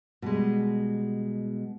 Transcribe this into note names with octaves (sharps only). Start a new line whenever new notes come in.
B2 G3 G#3